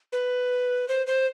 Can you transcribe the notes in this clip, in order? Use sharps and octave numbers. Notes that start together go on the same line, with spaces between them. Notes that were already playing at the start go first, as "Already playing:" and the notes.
B4
C5
C5